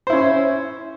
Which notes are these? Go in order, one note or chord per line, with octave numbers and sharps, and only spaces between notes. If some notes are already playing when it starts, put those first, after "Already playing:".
C#4 E4 C5